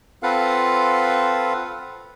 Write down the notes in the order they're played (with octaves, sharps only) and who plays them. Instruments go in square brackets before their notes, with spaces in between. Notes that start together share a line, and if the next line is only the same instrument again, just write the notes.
[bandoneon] C4 F4 A4 B4 F5 F#5